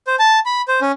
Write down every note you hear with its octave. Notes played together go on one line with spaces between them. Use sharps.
C5
A5
B5
C5
C#4